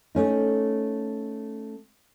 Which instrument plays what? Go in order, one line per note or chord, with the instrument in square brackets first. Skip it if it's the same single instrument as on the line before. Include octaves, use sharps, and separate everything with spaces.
[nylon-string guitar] A3 C#4 D#4